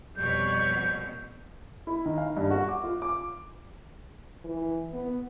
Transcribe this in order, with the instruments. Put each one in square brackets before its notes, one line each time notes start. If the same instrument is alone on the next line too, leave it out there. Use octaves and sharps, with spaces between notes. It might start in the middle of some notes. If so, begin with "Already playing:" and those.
[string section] F2 B2 [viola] G3 C#5 [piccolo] G6
[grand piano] E4
D#3
F5
G2
F#4
D6
F4
D6
[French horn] E3
B3